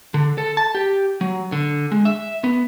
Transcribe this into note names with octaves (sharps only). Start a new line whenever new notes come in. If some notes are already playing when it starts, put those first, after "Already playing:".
D3
A4
A5
G4
F#3
D3
G#3
E5
B3